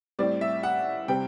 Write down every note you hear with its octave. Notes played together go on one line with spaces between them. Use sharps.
A2 G3 C4 D5
E5
F#5
C3 G3 C4 G5